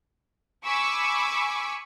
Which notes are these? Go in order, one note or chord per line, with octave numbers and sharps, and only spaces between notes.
G#5 B5 C#6 D6 E6